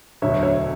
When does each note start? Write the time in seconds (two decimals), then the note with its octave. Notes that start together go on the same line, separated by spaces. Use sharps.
0.22 E1 D2 D3 F#3 C#5 E5
0.43 C#5 E5